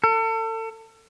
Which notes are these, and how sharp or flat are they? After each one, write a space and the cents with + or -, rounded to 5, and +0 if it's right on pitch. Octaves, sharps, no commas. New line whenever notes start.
A4 +35